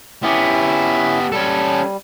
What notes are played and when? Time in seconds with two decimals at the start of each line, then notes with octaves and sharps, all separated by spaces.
0.23 B3 C#4 E4 G4
1.32 G3 C#4 A4